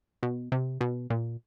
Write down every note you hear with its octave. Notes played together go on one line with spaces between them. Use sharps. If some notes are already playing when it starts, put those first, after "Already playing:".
B2
C3
B2
A#2